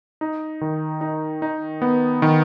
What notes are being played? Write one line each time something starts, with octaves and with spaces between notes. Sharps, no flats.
D#4
D#3
D#4
D#4
B3
D#3